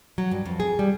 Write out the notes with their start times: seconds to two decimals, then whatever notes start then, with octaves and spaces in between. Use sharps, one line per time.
0.18 F#3
0.31 G2
0.46 F2
0.60 G#4
0.79 G3